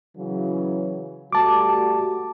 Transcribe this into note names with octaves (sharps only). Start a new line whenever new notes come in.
C#3 E3 F#3
G3 A3 F#4 A5 D6